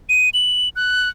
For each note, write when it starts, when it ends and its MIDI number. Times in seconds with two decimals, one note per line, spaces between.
0.09 0.29 99
0.34 0.69 102
0.76 1.09 90